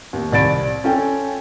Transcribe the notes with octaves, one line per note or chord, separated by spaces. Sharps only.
D#2
C2 D5 B5 A6 D7
C#4 F4 A4 G5